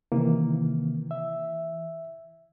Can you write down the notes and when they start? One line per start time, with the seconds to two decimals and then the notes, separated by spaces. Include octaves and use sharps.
0.12 C3 D#3 E3 A#3
1.11 E5